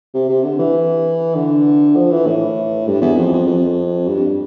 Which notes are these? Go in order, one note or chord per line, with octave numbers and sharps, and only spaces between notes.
C3
C3
D3
E3
D3
F3
E3
A2
G2
E2
F2
F2
F2
G2